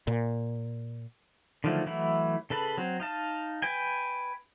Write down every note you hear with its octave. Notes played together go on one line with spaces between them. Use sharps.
A#2
D3 D#3 F3 F#3 A3
E3 F#3 A3 E4
C#3 A4 B4 A5 B5
F#3 C4
D#4 F5 A5
B4 G5 G#5